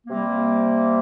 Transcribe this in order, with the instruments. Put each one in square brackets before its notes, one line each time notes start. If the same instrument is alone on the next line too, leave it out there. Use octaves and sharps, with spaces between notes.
[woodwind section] C3 G3 A#3